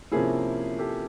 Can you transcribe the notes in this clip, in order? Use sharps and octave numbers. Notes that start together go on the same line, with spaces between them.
C3 F3 A#3 C#4 E4 G#4
G4 A4